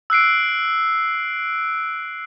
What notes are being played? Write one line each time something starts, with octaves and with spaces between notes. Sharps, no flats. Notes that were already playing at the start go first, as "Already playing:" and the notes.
E6 F#6 C7 D7